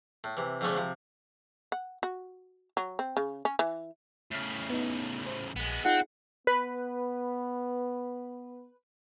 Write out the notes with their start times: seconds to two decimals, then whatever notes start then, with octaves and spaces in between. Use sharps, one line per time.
0.24 A2
0.37 C3 E3
0.61 F2 G#2 D3 A3 C#4 D4
0.77 C3 F3
1.72 F#5
2.03 F#4
2.77 F#3
2.99 C4
3.17 C#3
3.45 C#4
3.59 E3
4.31 A2 C#3 F6 B6 C7
4.70 B3 D#4
5.26 C5
5.56 A#1 G#3 B3
5.85 C4 D#4 F4 G#4 F#5
6.47 B3 B4